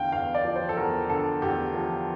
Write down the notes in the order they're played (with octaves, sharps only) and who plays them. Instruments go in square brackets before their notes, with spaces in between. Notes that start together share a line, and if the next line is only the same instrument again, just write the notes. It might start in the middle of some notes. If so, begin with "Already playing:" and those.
Already playing: [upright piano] E2 D3 F5 G5
E2 F5
D5
F3
C5
A4
E2 A#4
D3 A4
E2 G4
F3